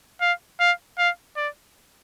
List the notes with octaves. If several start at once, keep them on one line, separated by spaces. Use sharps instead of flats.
F5
F5
F5
D5